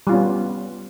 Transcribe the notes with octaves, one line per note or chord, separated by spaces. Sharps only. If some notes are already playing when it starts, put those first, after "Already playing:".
G3 B3 C#4 F4